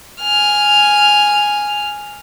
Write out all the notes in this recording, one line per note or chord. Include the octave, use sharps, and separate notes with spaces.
G#5 F6